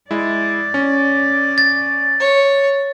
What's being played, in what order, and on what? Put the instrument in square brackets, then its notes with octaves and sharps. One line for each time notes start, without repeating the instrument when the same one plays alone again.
[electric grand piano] G#3 E4 [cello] D5
[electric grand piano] C#4
[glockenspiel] A6
[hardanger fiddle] C#5